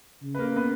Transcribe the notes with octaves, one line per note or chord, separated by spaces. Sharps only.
C#3
B4
A#3 A#4
B3 B4